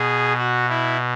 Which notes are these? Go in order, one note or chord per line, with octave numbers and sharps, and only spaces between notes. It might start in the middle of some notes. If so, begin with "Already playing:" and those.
Already playing: B2 G#4
F#4
E4